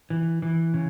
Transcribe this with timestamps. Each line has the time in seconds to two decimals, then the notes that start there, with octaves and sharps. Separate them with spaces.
0.10 E3
0.42 E3
0.74 C#3